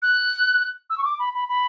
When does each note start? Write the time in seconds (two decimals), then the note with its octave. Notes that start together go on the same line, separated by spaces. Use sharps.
0.02 F#6
0.90 E6
0.98 C#6
1.04 D6
1.19 B5
1.34 B5
1.49 B5